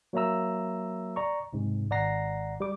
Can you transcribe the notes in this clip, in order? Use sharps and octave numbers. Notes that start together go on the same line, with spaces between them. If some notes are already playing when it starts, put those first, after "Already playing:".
F#3 A#3 C#5 E5 A#5 E6
D5 A#5 C#6
B1 G#2 C3
G#1 D5 F#5 A#5 A#6 C7
G3 D6